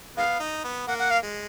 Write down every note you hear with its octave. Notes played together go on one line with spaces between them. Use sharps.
D#3 G#3 B3 F5
D#4
B3
A#3 F#5
F#5
F5
G#3